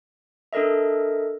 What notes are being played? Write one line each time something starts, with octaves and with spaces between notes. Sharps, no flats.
D4 A4 A#4 D#5 E5